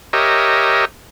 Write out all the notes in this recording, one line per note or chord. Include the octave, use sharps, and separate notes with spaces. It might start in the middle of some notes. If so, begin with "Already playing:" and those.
G4 A#4 C#5 D#5 E5